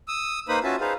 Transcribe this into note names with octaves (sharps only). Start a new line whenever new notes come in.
D#6 E6
A#3 D#4 B4 C5 B5 D#6
C#4 F4 F#4 E5 G#5 A5
D#4 G#4 B4 C5 F5